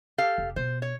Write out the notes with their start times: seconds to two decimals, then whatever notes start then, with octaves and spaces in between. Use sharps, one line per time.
0.18 G4 A4 F5
0.38 F1
0.56 B2 C5
0.82 C#5